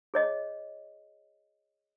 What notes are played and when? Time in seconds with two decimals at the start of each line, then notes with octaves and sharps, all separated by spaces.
0.14 G#4 C#5 D#5